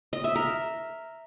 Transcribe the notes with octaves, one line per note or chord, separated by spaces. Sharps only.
D#5
E5
A#4